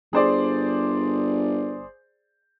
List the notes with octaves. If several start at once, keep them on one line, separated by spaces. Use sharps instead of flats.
G1 G#4 C5 D5